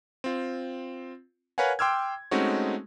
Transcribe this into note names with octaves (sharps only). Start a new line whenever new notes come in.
C4 F4
A#4 B4 C#5 F5 F#5 G#5
G5 C6 D6 E6 F6 G#6
G#3 A3 C4 C#4 D#4 F#4